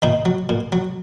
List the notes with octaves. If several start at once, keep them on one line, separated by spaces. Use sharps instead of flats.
A#2 D#3 D#4
F#3
A#2
F#3